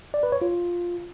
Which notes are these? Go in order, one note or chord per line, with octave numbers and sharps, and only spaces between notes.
D5
B4
C#5
F4